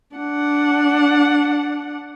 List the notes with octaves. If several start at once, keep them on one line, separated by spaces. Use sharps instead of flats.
D4 F#5